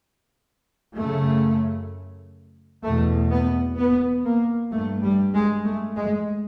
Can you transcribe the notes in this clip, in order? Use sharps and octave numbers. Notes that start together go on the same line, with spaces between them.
F#2 C#3 A3
E2 B2 A3
B3
B3
A#3
G2 A3
G3
G#3
A3
G#3